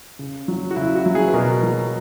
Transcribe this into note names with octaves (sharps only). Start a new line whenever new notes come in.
C#3
F#3
F#4
C#3 E4
F#4
F#3
G#4
B4
B2 A#4
F#3